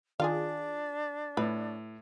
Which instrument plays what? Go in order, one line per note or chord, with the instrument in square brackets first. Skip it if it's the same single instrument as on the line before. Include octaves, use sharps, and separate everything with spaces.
[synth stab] D#3 F4 G#4 [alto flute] D4 [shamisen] F5
[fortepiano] A2 [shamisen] B4